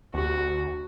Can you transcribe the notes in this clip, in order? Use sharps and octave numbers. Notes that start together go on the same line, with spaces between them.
D2 F#4